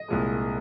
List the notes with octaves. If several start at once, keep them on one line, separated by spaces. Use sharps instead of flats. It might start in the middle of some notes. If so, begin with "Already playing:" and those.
Already playing: D#5
C2 A#2 F3 G#3